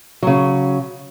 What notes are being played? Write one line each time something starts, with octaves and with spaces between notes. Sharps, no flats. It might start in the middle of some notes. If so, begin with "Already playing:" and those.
C#3 F#3